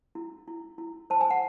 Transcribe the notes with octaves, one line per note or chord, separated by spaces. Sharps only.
E4
E4
E4
C5 A5
G#5
F#5